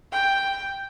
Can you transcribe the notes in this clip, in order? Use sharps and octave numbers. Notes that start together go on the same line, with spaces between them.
G5